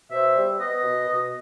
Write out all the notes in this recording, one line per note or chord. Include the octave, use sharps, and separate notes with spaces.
B2 C5 E5
G3
B3 B4 D#5
B2
B2